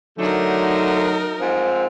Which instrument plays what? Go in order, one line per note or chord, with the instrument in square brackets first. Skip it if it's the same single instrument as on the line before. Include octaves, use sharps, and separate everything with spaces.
[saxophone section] D3 A3 [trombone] F#3 [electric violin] D#4 A#4
[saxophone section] G#2 F3 C4